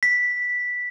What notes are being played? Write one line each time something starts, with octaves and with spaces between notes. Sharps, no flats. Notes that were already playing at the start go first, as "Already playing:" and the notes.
B6